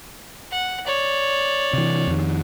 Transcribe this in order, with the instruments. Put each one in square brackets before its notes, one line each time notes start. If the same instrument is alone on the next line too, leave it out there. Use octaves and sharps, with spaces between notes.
[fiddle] F#5
C#5 D5
[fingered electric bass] C3 E3
F2 D#3